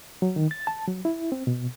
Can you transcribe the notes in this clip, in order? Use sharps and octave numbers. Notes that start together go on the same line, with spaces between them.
F#3
D#3
A6
A5
F#3
E4
C4
B2